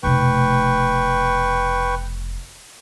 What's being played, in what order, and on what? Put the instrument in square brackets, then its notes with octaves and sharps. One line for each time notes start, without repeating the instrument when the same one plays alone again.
[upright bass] F1 B2 [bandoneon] B4 G5 C#6